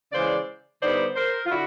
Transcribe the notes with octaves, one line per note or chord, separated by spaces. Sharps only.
C#3 E3 G#3 C5 D5
D3 G3 B3 D#4 C5 D5
A#4 C5
F4
D3 E4 F#4